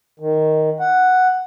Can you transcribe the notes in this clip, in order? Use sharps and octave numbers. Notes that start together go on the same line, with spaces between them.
D#3
F#5